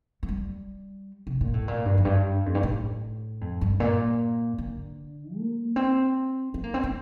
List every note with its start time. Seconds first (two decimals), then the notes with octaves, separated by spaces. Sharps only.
0.23 A3
0.29 G3
1.27 C3
1.41 A#2
1.54 A2
1.68 A#2
1.85 G2
1.98 F2
2.05 G2
2.46 F2
2.55 G2
2.63 A2
3.41 F2
3.61 G2
3.80 A#2
4.58 D3
5.37 A#3
5.76 C4
6.54 C4
6.64 A#3
6.74 C4
6.83 D4